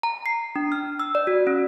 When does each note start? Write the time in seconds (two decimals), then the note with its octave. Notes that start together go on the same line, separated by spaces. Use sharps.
0.03 A#5
0.26 C7
0.56 D4
0.72 F6
0.99 E6
1.15 D5
1.27 F#4
1.47 C#4